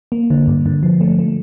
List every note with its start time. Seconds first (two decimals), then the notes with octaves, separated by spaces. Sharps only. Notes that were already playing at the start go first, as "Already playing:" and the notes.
0.12 A#3
0.30 D3
0.47 G2
0.66 D3
0.83 F3
1.01 A3
1.19 A3